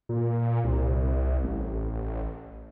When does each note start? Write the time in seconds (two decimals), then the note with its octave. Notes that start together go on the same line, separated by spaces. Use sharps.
0.09 A#2
0.64 C2
1.44 A1